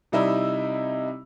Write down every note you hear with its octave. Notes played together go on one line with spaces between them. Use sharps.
C3 G3 D#4 E4 E6